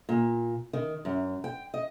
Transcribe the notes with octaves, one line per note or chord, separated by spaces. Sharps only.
A#2
D#3
F#2
G5
D#5